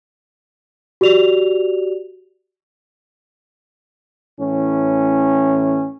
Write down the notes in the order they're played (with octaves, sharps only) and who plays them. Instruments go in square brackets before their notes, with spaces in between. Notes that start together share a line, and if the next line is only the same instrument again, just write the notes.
[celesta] F#4 G4 D5 F7
[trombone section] A2 E3 C#4